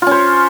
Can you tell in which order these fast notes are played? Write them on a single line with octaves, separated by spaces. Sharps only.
F4 C#4 C5